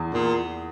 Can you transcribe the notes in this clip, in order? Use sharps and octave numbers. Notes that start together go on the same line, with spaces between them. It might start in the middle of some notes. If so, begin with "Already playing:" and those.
Already playing: E2
E2 A#2